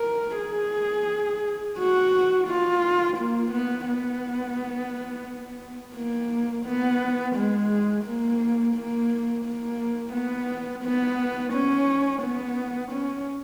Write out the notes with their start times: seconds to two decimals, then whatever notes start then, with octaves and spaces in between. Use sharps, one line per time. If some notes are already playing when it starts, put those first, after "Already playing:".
Already playing: A#4
0.38 G#4
1.78 F#4
2.47 F4
3.17 A#3
3.51 B3
3.87 B3
5.95 A#3
6.65 B3
7.35 G#3
8.04 A#3
8.75 A#3
9.44 A#3
10.13 B3
10.84 B3
11.53 C#4
12.22 B3
12.92 C#4